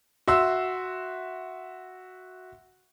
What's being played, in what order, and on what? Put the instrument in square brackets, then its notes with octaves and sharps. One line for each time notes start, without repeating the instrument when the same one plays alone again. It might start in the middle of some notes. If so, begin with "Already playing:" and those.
[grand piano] F#4 E5 C6 E6